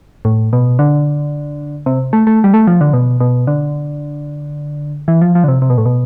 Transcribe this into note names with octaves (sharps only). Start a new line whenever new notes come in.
A2
B2
D3
C3
A3
A3
G3
A3
F3
D3
B2
B2
D3
E3
F3
F3
D3
C3
C3
B2
A2
B2